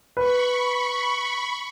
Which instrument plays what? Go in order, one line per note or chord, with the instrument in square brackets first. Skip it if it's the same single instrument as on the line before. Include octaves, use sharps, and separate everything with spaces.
[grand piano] B4 [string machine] B5 C#6